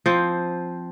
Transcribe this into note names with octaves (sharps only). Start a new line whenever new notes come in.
F3 C4